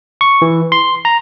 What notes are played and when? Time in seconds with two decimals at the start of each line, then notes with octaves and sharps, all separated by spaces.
0.21 C#6
0.42 E3
0.72 C6
1.05 A#5